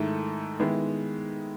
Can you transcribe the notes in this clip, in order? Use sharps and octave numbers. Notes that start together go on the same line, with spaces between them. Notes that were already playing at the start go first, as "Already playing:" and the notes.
Already playing: G#2 D#3 A3 E4 A4
D#3 G#3 B3 E4